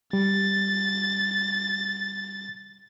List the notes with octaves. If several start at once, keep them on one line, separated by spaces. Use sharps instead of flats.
G3 A6